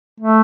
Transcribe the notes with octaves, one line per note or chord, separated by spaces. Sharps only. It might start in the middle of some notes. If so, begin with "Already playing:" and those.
A3